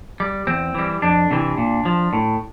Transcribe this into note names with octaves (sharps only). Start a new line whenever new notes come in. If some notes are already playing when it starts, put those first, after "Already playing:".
G3
E2 C4
E3 G3
F2 D4
C3 E3
A#2
F3
A2